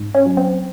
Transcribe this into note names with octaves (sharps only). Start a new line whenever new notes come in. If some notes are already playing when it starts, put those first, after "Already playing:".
Already playing: G#2
C#4
F#3
C4